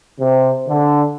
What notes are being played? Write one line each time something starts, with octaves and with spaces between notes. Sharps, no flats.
C3
D3